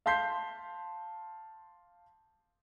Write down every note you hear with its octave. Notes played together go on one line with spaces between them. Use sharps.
F5 A5 C6 G6 B6 C7